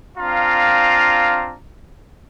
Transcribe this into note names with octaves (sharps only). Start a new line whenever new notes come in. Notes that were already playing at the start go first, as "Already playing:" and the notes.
C4 D4 F4 F5 A#5